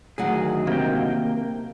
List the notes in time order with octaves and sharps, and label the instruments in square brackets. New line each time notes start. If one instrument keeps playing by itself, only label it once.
[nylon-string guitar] D2 F#3 F#5 [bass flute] D#3 [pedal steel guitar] G#4
[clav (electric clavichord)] C3 [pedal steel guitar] A#3 G5